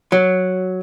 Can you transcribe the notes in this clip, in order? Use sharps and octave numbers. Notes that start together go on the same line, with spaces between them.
F#3